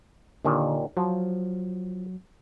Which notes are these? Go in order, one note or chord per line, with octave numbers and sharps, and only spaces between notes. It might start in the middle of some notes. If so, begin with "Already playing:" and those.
D#2 A#2 D3 D#3
F3 F#3